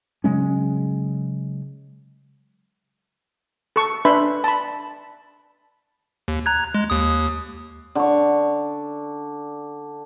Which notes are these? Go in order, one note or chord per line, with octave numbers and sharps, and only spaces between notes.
C#3 F#3 G#3 C#4
A4 C#6
D4 B4 E5 B5 C6
A5 B5
D#2
A#5 F#6 G#6
G#3
D#2 D#6
D3 C#6